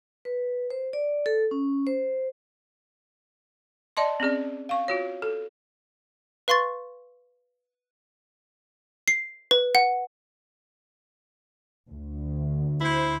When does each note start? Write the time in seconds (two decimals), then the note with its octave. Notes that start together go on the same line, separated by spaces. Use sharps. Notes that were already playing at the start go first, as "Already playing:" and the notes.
0.25 B4
0.70 C5
0.93 D5
1.26 A4
1.51 C#4
1.87 C5
3.97 D5 D#5 A5 C6
4.20 C4 C#4 G#4 D5
4.69 F5 C#6
4.88 F4 F#4 C#5
5.22 A4
6.48 B4 F5 C6 C#6 A6
9.08 C7
9.51 B4
9.75 F#5
11.90 D2
12.81 E4 C5